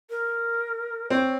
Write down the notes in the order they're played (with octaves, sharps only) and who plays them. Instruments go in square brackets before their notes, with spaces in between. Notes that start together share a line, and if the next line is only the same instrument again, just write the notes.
[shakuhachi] A#4
[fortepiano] C4 [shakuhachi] C#5